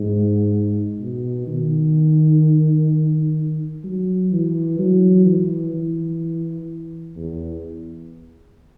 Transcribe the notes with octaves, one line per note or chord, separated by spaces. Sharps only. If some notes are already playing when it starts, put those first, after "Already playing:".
Already playing: G#2
B2
D#3
F#3
E3
F#3
E3
E3
E2